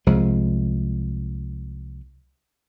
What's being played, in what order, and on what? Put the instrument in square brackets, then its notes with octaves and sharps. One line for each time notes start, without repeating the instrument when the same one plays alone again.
[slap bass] C2 F3 G#3